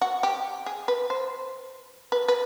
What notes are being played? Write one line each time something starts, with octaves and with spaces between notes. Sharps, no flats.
F#4
G4
G#4
B4
C5
B4
B4